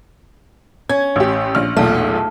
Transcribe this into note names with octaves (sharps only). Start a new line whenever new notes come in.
C#4 G#6
A1 G4
A#1 F6
B1 E2 A#2 A3